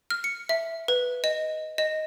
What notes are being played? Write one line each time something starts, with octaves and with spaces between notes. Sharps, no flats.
F6
C#7
E5
B4
D#5
D#5